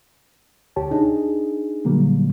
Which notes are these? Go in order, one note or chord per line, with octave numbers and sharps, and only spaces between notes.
D2 G4 C#5 A5
D4 D#4 G#4
A#2 D3 F#3 G3 A#3